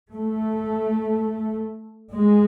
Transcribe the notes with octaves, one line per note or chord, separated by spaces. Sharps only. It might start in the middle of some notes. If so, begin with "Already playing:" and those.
A3
G#3